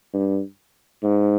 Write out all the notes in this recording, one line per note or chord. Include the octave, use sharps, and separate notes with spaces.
G2
G#2